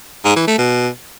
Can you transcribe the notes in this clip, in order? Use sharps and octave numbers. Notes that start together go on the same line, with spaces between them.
G#2
E3
A3
B2